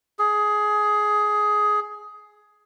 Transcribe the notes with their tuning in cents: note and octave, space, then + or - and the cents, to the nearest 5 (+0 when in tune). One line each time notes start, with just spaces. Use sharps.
G#4 +15